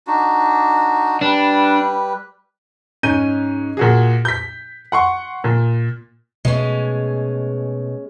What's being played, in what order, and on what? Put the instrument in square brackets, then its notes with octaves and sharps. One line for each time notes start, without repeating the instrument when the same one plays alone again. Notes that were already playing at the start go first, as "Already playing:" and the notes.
[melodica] D4 D#4 F#4
[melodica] G3 B4 [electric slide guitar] D4
[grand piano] G#2 C#4 G6 D#7
A#2 F#4 G#4
G6 B6
F#5 C6 C#6
A#2
[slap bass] B2 A3 [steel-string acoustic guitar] G#3 C#4